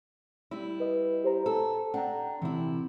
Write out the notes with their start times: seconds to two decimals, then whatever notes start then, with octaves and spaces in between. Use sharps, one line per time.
0.51 G3 E4
0.80 B4 D#5
1.24 G4 C5 A#5
1.46 A4
1.94 D4 F#5 G5 A#5
2.42 C3 E3 E4